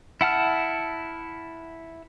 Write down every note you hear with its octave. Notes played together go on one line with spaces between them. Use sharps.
E4 F#5 A5 F6